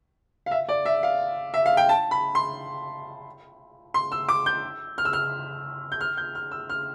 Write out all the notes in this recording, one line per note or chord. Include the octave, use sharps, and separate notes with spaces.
F5
E5
D5
E5
F5
E5
F5
G5
A5
B5
C6
C6
E6
D6
G6
F6
E6
F6
G6
F6
G6
F6
E6
F6